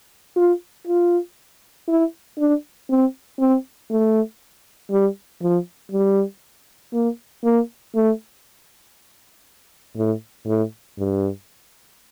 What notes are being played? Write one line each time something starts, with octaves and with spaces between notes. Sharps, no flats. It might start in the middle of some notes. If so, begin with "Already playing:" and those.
F4
F4
E4
D4
C4
C4
A3
G3
F3
G3
A#3
A#3
A3
A2
A2
G2